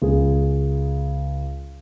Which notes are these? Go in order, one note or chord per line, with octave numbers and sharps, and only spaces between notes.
C#2 G#4